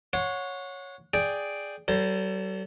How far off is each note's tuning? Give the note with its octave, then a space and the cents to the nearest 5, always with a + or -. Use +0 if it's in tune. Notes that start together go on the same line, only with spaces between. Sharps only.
C#5 +0 F#5 -25 C6 +0
G#4 +0 D5 +0 G5 +0
G3 -45 A4 +30 C5 +0